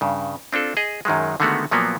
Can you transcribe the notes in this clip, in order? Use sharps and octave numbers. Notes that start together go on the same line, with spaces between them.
G2 C#3
C4 D4 F4 A4
G#4 D#5
F#2 D#3 F#3 G#3
D3 D#3 G#3 A3 B3 F#4
A#2 F3 F#3 A#3 B3